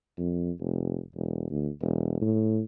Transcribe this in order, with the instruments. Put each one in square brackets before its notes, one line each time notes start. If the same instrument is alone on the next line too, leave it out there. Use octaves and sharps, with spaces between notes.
[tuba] F2
F1
E1
D2
E1
A2